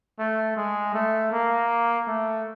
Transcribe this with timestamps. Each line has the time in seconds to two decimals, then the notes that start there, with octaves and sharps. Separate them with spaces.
0.19 A3
0.57 G#3
0.94 A3
1.32 A#3
2.08 A3